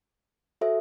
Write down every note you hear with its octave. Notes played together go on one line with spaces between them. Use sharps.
F#4 A4 C5 E5